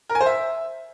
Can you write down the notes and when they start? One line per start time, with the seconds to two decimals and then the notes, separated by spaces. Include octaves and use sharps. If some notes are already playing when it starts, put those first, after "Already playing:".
0.09 A#4
0.15 G#5
0.21 C5
0.26 E5